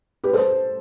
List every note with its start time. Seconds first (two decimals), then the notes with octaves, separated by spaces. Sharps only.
0.24 G4 B4
0.33 A4 C5